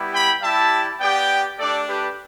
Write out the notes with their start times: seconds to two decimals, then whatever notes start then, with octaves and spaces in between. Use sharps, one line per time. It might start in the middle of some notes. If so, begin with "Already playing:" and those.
Already playing: G3 B3 E4 G4
0.13 G5 B5
0.42 G3 E4 G4 E5 A5
1.00 B3 G4 D5 G5
1.58 A3 D4 G4 A4 D5
1.88 G4 B4